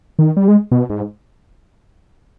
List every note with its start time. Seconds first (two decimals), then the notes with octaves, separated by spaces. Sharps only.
0.19 D#3
0.37 G3
0.48 G#3
0.72 B2
0.90 G#2